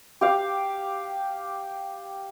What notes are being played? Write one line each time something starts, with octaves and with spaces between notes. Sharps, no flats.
G4 F5